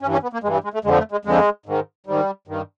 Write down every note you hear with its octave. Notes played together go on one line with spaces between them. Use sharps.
G2 E3 C#4
C#4
B3
A#3
G2 E3 G#3
G3
G#3
A3
F2 D3 F3 G#3
A3
G#3
F2 D3 F3 G#3
G#2 D#3
G#2 D#3 G3
G2 D#3